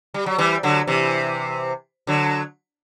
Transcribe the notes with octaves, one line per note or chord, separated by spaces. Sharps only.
G3
F#3
E3 G3
D3 F#3
C3 E3
D3 F#3